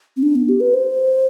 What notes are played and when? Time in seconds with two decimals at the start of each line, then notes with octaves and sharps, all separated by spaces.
0.17 C4
0.23 D4
0.35 B3
0.49 G4
0.60 B4
0.74 C5